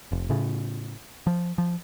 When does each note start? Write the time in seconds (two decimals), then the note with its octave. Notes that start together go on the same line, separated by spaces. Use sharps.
0.11 F1
0.30 A2 C#3
1.27 F3
1.58 F3